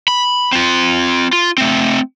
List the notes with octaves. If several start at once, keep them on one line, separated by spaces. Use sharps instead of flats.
B5
C4 F4
F4
A3 C4